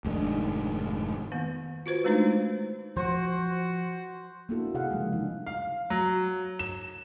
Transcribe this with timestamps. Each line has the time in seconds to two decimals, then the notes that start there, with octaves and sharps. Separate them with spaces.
0.05 F1 G#2 D#3 D4
1.32 D#3 A#3 B3
1.86 F4 F#4 B4 C5
2.04 G#3 A3 D4 D#4 C5
2.97 F3 F#4 C5
4.49 A#3 B3 D4 E4 F#4 A4
4.74 C3 G#4 F5 F#5
4.91 C#3 F3 G3 G#3
5.13 E3 D4 D#4
5.47 F5
5.90 F#3
6.59 E7